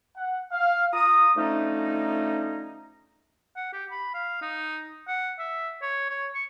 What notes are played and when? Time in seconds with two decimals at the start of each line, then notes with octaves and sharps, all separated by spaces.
0.15 F#5
0.52 F5
0.93 F4 A#5 D#6
1.37 D3 F3 A3 C#4 D#4
3.56 F#5
3.73 G4
3.91 B5
4.14 F5
4.42 D#4
5.08 F#5
5.39 E5
5.82 C#5
6.10 C#5
6.35 C#6